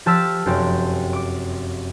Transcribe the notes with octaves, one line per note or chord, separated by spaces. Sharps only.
F3 G4 A5 E6 F6 B6
F1 F#2 C4 G4
D6